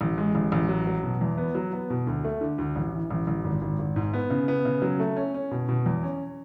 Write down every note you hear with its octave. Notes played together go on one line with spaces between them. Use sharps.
A1
G#3
A1
A1
F#3
F#3
B2
E2
B3
F#3
B3
B2
D2
A3
D3
D2
A1
E3
A1
A1
G#1
G#1
G#1
G#2
B3
C#3
B3
C#3
F#3
A3
C#4
C#4
B2
B2
E2
C#4